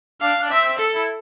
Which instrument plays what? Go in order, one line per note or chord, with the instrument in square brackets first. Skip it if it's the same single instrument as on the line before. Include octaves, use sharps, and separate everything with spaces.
[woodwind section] D4 [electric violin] F5
[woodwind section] D4
[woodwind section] C4 [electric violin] E5
[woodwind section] C4
[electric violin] A4
[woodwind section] E4